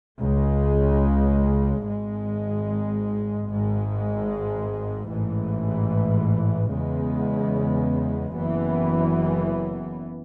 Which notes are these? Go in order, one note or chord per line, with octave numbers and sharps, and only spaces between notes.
C#2 C#3 G#3
G#1 G#2 G#3
G#1 G#2 G#3
A1 G#2 E3
E2 C#3 G#3 B3
F#1 F#2 E3 B3